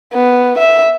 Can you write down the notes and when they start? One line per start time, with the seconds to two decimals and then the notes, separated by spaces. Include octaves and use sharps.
0.14 B3
0.59 E5